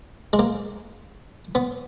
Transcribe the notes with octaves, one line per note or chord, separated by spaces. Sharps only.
G#3
A#3
B3